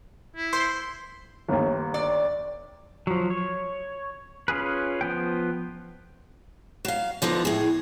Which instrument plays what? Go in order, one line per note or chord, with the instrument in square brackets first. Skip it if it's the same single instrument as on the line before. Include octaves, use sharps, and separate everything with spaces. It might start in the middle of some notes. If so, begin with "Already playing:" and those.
[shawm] E4
[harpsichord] C5 [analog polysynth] C6
[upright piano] G1 D#2
[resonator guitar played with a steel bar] D5
[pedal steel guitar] F3 F#3
C#5
C#4 F4 G#4 B4
F3 B3 G5
[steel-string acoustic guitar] F#3 F5
D3 F3 B3 D#4
A2 G#4